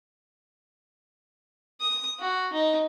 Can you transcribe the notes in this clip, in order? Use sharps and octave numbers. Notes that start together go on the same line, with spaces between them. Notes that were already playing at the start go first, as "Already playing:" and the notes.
D#6
F#4
D#4